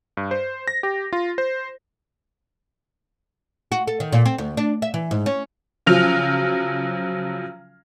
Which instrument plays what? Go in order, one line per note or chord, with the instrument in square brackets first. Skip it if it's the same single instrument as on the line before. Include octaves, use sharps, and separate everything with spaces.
[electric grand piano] G2
C5
A#6
G4
F4
C5
[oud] F#4
A4
D#3
A#2
C4
D2
D4
E5
E3
G#2
C#4
[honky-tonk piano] C#3 F3 F#3 F6 F7